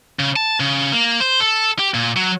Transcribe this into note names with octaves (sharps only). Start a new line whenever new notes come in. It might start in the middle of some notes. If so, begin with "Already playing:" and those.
C#3
A5
C#3
A#3
C5
A4
G4
A#2
F#3